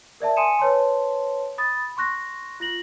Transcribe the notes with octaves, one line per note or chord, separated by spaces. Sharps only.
A#4 D5 E5 A5
G#5 C6 D#6 C#7 D#7 E7
B4 C#5 A5 C6
B5 D#6 A6
C6 C#6 F#6 A#6
F4 A#6 F#7